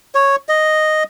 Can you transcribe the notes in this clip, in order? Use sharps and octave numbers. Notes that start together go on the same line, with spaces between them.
C#5
D#5